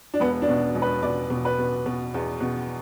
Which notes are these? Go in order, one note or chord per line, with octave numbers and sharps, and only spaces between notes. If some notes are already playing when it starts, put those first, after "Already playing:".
D4
E1 B3
D4
B2
E1
B4
B2 D5
B2
B4
B2
B2
E2
B2